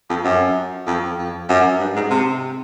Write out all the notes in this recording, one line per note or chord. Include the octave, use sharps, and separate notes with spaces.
F2
F#2
F2
F2
F#2
G2
G#2
C3